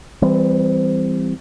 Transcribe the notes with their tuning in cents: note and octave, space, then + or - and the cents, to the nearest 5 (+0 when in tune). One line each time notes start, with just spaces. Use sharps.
E3 +15 G3 +15 C4 -15